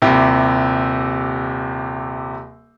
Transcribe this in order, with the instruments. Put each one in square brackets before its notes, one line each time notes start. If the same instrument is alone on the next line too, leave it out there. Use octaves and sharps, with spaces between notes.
[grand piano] D#1 C3 E4 G4